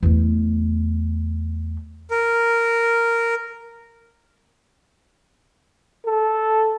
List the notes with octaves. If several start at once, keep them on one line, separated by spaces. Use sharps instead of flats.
E2 A3
A#4
A4